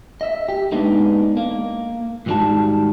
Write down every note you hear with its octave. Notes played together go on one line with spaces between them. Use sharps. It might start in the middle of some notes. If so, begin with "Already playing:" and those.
D#5 E5
G4
G#3 A#3 B3 D4 D#4
A#3
G#2 D#3 E3 G3 F#4 A5